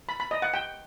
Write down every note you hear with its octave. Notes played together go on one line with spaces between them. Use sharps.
B5
B5
D#5
F#5
G5